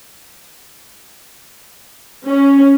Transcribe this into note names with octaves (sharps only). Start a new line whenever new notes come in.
C#4